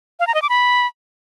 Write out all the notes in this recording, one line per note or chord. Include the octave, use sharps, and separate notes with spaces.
F5
A#5
D#5
D6
B5